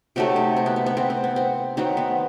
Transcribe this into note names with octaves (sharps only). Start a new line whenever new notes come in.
C3 F#3 A3 D#4
D#4
C4
B3
B3
B3
C4
C4
B3
C4
D#3 F#3 B3 C4
B3